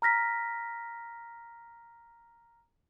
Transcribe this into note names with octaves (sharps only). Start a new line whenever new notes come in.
A#5 F6 A#6 B6